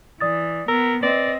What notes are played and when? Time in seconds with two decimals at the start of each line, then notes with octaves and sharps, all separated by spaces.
0.20 E3 D5 D#6 A6
0.68 B3 A#4 E6
1.03 C4 B4 D5 D#5